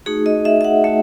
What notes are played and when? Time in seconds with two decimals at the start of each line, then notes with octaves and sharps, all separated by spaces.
0.06 A3 D#4 F#4 G#4
0.26 D#5
0.45 E5
0.61 E5
0.64 F#5
0.84 A3 D#4 F#4 E5